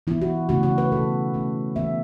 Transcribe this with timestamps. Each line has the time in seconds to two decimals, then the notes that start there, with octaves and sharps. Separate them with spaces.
0.07 E3 B3 E4
0.22 F#4
0.49 C#3 A3 C#4 F#4
0.63 F#4
0.78 B4
0.92 B2 B3 A4
1.34 E3 A3 C#4
1.76 E3 B3 E5